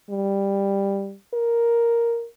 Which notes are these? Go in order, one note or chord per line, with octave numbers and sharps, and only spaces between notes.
G3
A#4